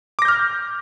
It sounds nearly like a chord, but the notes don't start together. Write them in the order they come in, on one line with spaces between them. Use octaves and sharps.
D6 A#6 G6 F6